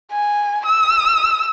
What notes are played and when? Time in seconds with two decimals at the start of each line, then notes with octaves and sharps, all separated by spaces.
0.12 G#5
0.66 E6